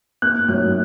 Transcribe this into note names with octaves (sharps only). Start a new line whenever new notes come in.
A#3 F#6
F#3 F#6